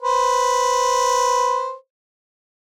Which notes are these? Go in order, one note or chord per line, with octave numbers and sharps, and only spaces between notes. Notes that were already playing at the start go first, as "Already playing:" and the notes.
B4 C5